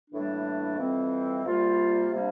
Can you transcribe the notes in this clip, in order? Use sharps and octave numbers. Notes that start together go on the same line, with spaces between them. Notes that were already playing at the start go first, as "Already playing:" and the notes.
A2 E3 G3 A#3 D4
F2 E3 G3 C4
C2 C3 G3 A#3 F4
C3 G3 A#3 D4